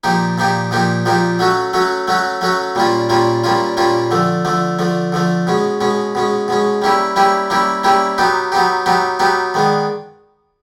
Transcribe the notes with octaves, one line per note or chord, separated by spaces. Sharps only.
A#2 F3 A#3 D#4 G4
A#2 F3 A#3 D#4 G4
A#2 F3 A#3 D#4 G4
A#2 F3 A#3 D#4 G4
F#3 A3 C#4 F#4
F#3 A3 C#4 F#4
F#3 A3 C#4 F#4
F#3 A3 C#4 F#4
A#2 G3 A#3 C#4 F4
A#2 G3 A#3 C#4 F4
A#2 G3 A#3 C#4 F4
A#2 G3 A#3 C#4 F4
D3 F3 A3
D3 F3 A3
D3 F3 A3
D3 F3 A3
B2 G#3 C#4
B2 G#3 C#4
B2 G#3 C#4
B2 G#3 C#4
G3 A#3 C#4 E4 G4
G3 A#3 C#4 E4 G4
G3 A#3 C#4 E4 G4
G3 A#3 C#4 E4 G4
F#3 B3 D#4 G4
F#3 B3 D#4 G4
F#3 B3 D#4 G4
F#3 B3 D#4 G4
D#3 G#3 B3 D4